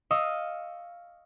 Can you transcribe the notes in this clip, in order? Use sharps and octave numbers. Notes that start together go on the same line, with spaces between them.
D#5 F5 C#6 D#6 E6